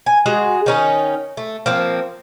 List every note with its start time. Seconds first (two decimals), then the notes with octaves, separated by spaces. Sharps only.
0.06 G#5
0.26 G#3 F#4 G#4
0.66 D#3 C#4 D#4
1.37 A3
1.66 F3 A#3 C4